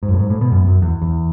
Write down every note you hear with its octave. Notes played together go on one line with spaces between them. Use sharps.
G#2
F#2
A2
G#2
A2
B2
F#2
F#2
E2
E2